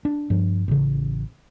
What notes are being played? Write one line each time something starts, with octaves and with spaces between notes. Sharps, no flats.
D4
G2 F3
A1 C#3